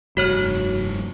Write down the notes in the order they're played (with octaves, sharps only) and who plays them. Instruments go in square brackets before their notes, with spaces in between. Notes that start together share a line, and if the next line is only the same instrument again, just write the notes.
[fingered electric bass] F1 [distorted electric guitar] G2 A#3 [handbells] F#4 C#5 F6